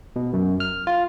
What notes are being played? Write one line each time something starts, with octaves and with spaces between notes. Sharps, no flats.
B2
F#2
F6
F4